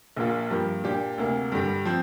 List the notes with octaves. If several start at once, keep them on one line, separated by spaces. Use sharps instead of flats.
A#1 A#2 A#3 F4
G2 F3 A#3 G4
A#2 A#3 D4 G4
D2 C3 A#3
G2 D3 G3
F3 C4